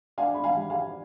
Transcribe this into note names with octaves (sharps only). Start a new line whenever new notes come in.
D4 F5 G#5
B5
F5 G#5
G3
F5 G#5